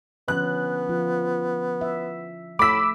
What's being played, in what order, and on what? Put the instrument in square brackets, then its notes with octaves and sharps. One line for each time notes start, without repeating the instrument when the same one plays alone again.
[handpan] D3 F3 C#4 [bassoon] B3 [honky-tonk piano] F#6
[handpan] F3 F4
E5
[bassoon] A2 [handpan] A3 [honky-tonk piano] B5 B6 [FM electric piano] D6 E6